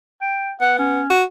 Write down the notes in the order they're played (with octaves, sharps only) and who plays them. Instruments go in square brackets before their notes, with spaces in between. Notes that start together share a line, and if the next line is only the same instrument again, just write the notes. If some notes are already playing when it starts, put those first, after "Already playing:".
[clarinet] G5
[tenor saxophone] B3 [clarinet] F#5
[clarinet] C#4
[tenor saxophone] F#4